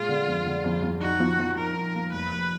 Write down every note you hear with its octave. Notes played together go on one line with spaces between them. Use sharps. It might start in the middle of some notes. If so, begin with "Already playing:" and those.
Already playing: A#2 G#3 F4
D3
F2
D3
F2
F2
D#4 F#4
F3
F3
D#4 A#4
D#4
A#3
F1 B4
F1